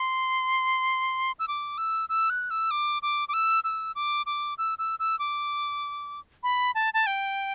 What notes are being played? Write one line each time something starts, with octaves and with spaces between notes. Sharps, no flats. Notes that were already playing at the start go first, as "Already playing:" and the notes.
Already playing: C6
E6
D6
E6
E6
F#6
E6
D6
D6
D6
E6
E6
D6
D6
E6
E6
E6
D6
B5
A5
A5
G5